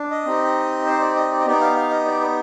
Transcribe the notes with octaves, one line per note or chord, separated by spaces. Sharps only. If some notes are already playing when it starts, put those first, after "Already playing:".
Already playing: D4
D#5
C4 D#4 G4
C5
D5
D#5
D5
D#5
B3 D#4 G4 D5
F5
F5
D#5
D5
B4